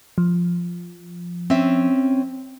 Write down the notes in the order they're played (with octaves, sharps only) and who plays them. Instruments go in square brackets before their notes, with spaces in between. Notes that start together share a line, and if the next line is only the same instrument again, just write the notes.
[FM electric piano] F3
[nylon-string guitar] C4 C#4 E5